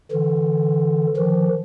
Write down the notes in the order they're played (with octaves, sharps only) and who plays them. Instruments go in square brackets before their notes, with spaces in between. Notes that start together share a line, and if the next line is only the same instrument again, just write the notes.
[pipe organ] D3 E3
D#3 F3